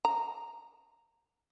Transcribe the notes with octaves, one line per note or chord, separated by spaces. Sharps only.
A#5